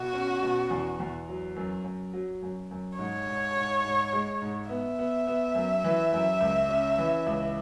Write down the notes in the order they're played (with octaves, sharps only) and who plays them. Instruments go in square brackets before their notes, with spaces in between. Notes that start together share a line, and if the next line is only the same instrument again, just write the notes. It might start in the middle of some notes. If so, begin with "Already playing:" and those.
Already playing: [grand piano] B2 [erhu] F#4
[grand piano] C#4
B2
E2
E2
F#3
F#2
F#2
F#3
F#2
F#2
[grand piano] G#2 [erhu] C#5
[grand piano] G#2
G#2
G#2
G#3
G#2
[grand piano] B3 [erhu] E5
[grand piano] B3
B3
F#2
E3
F#2
C#2
C#4
E3
C#2